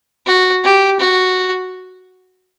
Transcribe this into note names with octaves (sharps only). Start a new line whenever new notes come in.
F#4
G4
F#4